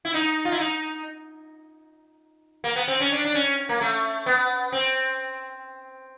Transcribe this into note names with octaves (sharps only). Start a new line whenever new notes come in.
E4
D#4
F4
E4
D#4
A#3
B3
C4
C#4
D4
D4
C#4
A#3
A3
B3
C4